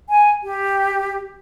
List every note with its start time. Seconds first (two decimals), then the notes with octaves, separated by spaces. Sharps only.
0.09 G#5
0.43 G4